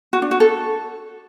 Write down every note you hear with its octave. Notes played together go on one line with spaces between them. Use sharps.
F#4
D4
F#4
A4